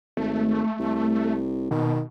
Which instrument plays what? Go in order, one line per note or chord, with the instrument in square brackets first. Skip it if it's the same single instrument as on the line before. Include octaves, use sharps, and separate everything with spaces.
[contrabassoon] G#1 [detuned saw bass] A3
[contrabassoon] C2
[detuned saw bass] B2 [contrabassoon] D#3